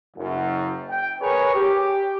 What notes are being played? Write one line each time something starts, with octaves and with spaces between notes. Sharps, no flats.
F#1 F#2
G5
G#4 A#4 B4 C#5
G4